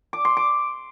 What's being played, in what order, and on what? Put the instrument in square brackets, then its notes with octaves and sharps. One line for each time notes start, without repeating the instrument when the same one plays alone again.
[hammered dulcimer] D6
C6
D6